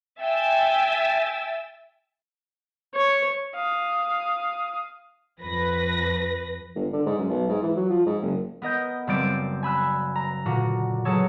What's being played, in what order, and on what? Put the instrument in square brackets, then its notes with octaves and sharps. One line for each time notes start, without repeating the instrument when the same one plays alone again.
[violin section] E5 G5 G#5 E6 A6
[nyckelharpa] C#5
[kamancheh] F5 D#6
[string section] F2 B4 A#6
[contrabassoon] G1
D3
G#2
F#2
B1
G#2
E3
F#3
F3
G#2
F#1
[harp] B3 A#4 D#5 G6
F#1 G3 C4 D5 D7
G#5 B5 E6 F#6
A#5
A#2 D3 F#4
F#3 G#4 A4 C#5